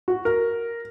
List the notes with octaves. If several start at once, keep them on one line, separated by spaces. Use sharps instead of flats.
F#4
A#4